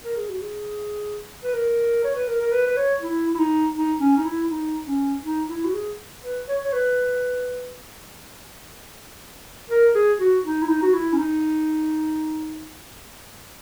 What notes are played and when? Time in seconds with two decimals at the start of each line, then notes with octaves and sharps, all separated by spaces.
0.04 A#4
0.17 G#4
0.29 F#4
0.42 G#4
1.44 B4
1.53 A#4
2.04 C#5
2.15 B4
2.27 A#4
2.42 A#4
2.52 B4
2.67 B4
2.77 C#5
3.01 E4
3.35 E4
3.39 D#4
3.75 D#4
4.00 C#4
4.17 D#4
4.25 E4
4.50 D#4
4.88 C#4
5.24 D#4
5.49 E4
5.65 F#4
5.74 G#4
6.23 B4
6.48 C#5
6.65 C#5
6.73 B4
9.70 A#4
9.95 G#4
10.20 F#4
10.44 D#4
10.62 E4
10.68 D#4
10.82 F#4
10.94 E4
11.13 C#4
11.18 D#4